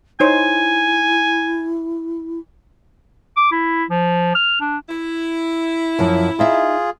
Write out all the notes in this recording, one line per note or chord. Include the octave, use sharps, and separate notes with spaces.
D#4 E4 C5 C#5 G#5
D6
E4
F3
F6
D4
E4
F#2 F3
D#4 F4 G#4 D#5 E5